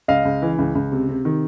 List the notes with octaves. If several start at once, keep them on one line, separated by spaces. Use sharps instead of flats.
C#2 D#5 F5
C#2
E3
C#2
C#2
C3
C3
D#3